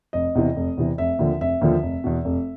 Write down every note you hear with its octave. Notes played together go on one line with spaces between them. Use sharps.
F1 D#5
E2 C3 E3
F1
E2 C3 E3
F1 E5
D#2 D3 F3
F1 E5
D#2 D3 F3
F1
E2 B2
F1